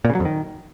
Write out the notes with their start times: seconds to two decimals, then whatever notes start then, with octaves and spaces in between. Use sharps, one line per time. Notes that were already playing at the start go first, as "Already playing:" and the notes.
0.05 A#2
0.10 C#3
0.15 F#3
0.20 F2
0.25 D#3